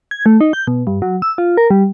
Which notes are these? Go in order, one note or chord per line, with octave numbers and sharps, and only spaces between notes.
G#6
A3
D#4
G6
B2
G2
F#3
E6
F4
A#4
G3